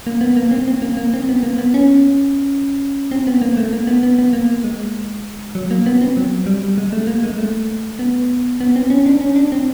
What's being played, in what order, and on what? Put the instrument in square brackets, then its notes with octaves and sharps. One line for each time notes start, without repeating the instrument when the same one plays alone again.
[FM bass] A#3
B3
A#3
C4
C4
A#3
A#3
C4
B3
A#3
B3
C#4
C4
B3
A#3
A3
A#3
B3
B3
B3
A#3
G#3
F#3
A#3
B3
C4
F#3
G3
G#3
A3
A#3
G#3
A3
B3
B3
C4
C#4
D4
C#4
D4
C4